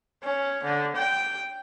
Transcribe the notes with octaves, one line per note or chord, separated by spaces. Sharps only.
C#4
D3
G5